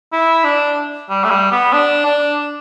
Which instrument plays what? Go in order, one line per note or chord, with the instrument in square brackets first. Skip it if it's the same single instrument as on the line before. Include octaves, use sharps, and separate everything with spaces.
[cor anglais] E4
D4
G3
A3
G3
B3
D4
D4